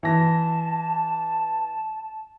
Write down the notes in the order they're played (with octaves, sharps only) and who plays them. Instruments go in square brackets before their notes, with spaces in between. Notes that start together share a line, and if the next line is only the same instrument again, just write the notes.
[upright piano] E3 A#6 [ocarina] A5